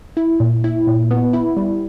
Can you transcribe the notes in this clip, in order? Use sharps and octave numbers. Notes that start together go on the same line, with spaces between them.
E4
A#2
E4
A#2
B3
E4
G3